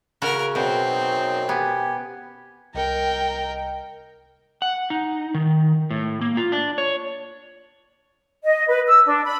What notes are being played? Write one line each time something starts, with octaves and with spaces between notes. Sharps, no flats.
C#3 C#4 F#4 A#4
F#2 B2 C4 G5
D#4
B3 G4 G#5
C2 A#4 D#5 G5 C#7
F#5
D#4
D#3
A2
A#3
F4
D4
C#5
D#5
B4
E6
D4
B5